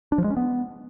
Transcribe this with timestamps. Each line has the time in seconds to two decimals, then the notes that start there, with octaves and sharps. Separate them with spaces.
0.12 D4
0.18 F3
0.24 G#3
0.30 C#4
0.37 B3